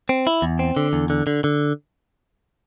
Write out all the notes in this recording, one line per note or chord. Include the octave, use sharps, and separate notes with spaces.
C4
E4
E2
C4
D3
E2
D3
D3
D3